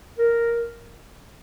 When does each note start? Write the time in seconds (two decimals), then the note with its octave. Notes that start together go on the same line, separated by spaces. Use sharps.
0.18 A#4